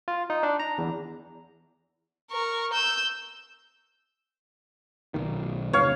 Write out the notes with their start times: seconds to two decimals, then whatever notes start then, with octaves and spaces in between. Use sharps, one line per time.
0.08 F4
0.30 D#4
0.43 D4
0.60 A#5
0.78 E2
2.31 A#4 C#6
2.73 E6 G6
5.14 B1 D#3
5.73 F1 C#2 C#5 F5